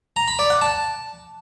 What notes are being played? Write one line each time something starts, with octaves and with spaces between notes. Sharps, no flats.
A#5
B5
D5
F#5
A5